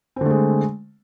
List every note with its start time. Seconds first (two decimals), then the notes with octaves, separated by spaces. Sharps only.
0.16 C4
0.21 D3
0.26 A3
0.30 G#3